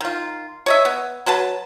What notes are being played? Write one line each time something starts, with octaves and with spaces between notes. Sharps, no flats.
D#3 F4
C#5 D#5 E5
B3
F#3 F#4 B4 A5